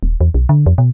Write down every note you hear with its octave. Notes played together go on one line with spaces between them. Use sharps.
D#1
E2
B1
D3
F2
B2